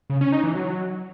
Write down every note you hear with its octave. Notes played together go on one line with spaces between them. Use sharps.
C#3
C#4
D#4
E3
F#3